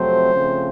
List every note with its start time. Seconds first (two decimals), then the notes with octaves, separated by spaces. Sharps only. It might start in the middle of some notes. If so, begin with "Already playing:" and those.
Already playing: F2 C3 F#3 A3 C4 C5
0.34 C#3 F3 A3 C4